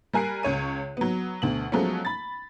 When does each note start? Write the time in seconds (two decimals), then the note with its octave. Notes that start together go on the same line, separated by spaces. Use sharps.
0.13 G3 A#4 G#5 F#6 C7 D7
0.43 C#2 C#5 D#7
0.97 F#3 B3
1.42 D2 B2 F#7
1.72 F3 F#3 G#3 A3 B3 C#4
2.05 B5 A6